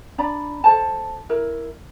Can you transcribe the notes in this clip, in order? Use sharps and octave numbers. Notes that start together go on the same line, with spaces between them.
D4 D5 A#5 B5
A4 C5 A5
E4 A#4